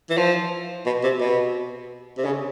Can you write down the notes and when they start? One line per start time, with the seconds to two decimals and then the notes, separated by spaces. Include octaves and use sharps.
0.10 E3
0.17 F3
0.86 B2
1.03 C3
1.21 B2
2.18 C3
2.25 C#3